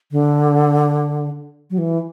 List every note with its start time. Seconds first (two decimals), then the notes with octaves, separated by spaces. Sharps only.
0.12 D3
1.70 F#3
1.78 E3